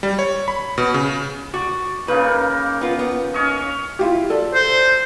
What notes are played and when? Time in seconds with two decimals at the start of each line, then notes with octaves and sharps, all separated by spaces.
0.03 G3
0.19 C#5
0.48 B5
0.78 B2
0.94 C#3
1.54 F#4 D5
2.08 C#3 A#3 D#4 B4
2.81 B3 F4
2.99 B3
3.34 C#4 C#5 D#5
3.99 E4 F4 G4
4.30 A4 D5
4.54 C5